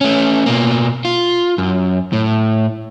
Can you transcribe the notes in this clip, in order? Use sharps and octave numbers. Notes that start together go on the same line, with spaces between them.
A3 C#4
B2 A#3
F4
F#2
A2